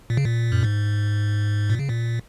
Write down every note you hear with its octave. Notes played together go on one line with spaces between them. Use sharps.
A#2
C#3
A#2
F#2
G#2
A#2
C#3
A#2